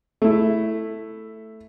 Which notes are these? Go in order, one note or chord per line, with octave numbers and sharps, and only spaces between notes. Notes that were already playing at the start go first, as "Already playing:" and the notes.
A3 E4